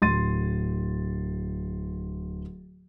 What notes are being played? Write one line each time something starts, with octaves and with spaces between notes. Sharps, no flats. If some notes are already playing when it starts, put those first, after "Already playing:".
D1 C6 A6 D#7